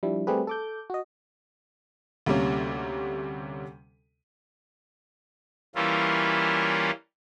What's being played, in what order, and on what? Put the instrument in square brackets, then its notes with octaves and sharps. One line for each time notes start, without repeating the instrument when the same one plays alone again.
[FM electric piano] F3 G3 D4 E4
G3 A3 C4 G4 G#4 B4
A4 D6 G6
F#4 D#5
[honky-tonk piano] D2 C3 G3 A#3 C#4
[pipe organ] E3 G3 A#3 C#4 E4 F4